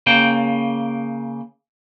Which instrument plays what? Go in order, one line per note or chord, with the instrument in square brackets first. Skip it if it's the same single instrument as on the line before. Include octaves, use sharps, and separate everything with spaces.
[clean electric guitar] C#3 A#3 G5